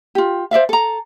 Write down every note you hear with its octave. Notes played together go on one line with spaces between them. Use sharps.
F4 G4
C5 D5 E5 F5
A4 A#5